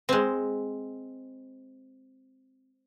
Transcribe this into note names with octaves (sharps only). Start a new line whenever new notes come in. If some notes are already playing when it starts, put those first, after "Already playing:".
G#3 C4